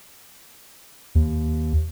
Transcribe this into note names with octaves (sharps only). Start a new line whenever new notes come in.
D#2